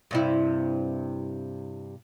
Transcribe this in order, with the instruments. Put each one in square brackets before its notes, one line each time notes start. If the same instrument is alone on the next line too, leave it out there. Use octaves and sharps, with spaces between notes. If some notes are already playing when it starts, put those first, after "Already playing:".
[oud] G2 C3 E4